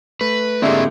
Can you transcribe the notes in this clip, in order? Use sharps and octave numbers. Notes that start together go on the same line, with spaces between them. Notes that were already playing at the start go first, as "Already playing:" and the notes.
A3 B4
D3 G#3 A#3 C4 D4 E4 G4 G#4